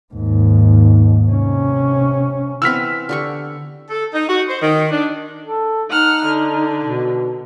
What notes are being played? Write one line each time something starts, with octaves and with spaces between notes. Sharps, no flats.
D#2 G#2
C3 C#4
E3 B3 C4 E6 F6 B6
D3 G4 C#6
A4
D#4
F#4
C5
D#3
D4
A4
D#4 F#5 F6
D3
B2